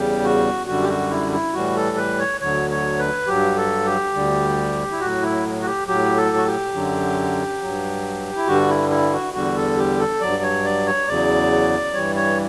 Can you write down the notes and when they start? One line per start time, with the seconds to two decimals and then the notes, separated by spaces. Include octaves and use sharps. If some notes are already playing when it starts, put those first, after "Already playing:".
Already playing: E2 C#3 G3 G4
0.24 F#4
0.67 F#2 D3 G3 F#4
0.83 G4
0.89 F#4
1.11 E4
1.32 E4
1.54 A2 E3 G3 F#4
1.76 A4
1.97 B4
2.19 C#5
2.41 D2 D3 F#3 C#5
2.70 C#5
2.99 B4
3.27 G2 F#3 G4
3.57 A4
3.86 G4
4.14 D2 D3 G3
4.92 E4
5.01 A2 F#3 F#4
5.22 E4
5.62 F#4
5.66 G4
5.87 A2 F#3 G4
6.17 A4
6.37 F#4
6.46 G4
6.74 F#2 D3 F#3
7.61 G2 F#3
8.36 E4
8.47 G2 D3 G3 F#4
8.69 E4
8.90 E4
9.13 F#4
9.34 E2 D3 G3 F#4
9.57 A4
9.78 G4
9.99 A4
10.21 G2 F#3 D5
10.43 C#5
10.64 D5
10.87 C#5
11.08 E2 C#3 F#3 D5
11.94 G2 E3 G3 C#5
12.15 C#5